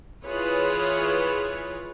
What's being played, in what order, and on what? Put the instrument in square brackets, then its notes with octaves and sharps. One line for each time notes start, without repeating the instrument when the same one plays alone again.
[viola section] E3 E4 F4 G#4 B4 C#5